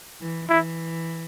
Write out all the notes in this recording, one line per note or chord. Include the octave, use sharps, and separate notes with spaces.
E3
E3 E4